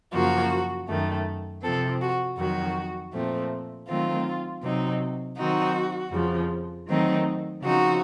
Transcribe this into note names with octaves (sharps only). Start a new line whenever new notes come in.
F#2 C#3 F3 A#3 F#4
F#2 D#3 A3
C3 F3 C4 A4
F#4
F2 D#3 F#3 F#4
A#2 F3 A3 C4
D#3 F#3 A3 C4 F4
C3 F#3 C4 D#4
D#3 F#3 C4 D#4 F#4
F2 C#3 F3
D#3 F#3 A3 C4 D#4
C#3 F3 C4 D#4 F#4